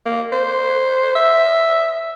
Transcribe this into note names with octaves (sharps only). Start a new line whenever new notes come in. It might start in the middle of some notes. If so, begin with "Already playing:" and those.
A#3
C5
E5